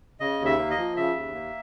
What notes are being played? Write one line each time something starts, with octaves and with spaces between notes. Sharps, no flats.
C#3 D#5
D#2
E5
A#3
D#5
F3
C#3 E5
D#2
A#3